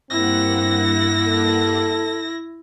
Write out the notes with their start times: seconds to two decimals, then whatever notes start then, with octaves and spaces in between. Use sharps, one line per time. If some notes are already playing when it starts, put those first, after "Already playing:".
0.10 G2 A#3 C4 E4 F#5 A#6
1.27 A4